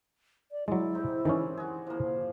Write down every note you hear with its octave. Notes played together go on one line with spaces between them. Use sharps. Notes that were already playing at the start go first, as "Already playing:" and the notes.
D5
F#3 G#3 E4 D5
C4 D#4 G4
D#3 E3 G#3 C#4 G#4 D5
F#4 G#4
F3 A#3 E4